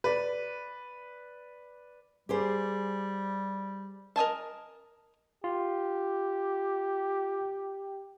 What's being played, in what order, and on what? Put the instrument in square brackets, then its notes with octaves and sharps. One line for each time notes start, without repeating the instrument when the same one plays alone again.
[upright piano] B4 D5
[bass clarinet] G3 [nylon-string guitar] G4 G#4 C5
[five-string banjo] A#4 D#5 G#5 A5
[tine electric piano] F4 [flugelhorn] G4